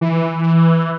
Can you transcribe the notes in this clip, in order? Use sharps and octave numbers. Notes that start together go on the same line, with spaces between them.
E3